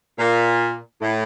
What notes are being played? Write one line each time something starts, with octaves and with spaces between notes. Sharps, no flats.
A#2
A2